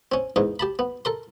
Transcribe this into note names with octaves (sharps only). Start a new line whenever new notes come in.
C4 C#4
E2 G#2 D#4
G4 A5 B5
B3
A4 A#4 C6